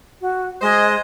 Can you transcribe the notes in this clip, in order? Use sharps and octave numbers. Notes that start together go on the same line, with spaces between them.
F#4
G#3 C5 D#5